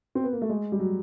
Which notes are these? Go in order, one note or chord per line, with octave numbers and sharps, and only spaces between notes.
C4
B3
A#3
A3
G#3
G3
F#3